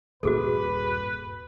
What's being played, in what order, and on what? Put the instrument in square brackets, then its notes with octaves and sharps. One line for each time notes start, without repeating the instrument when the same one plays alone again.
[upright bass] D#1 G2 [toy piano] F#4 G#4 A4 [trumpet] B4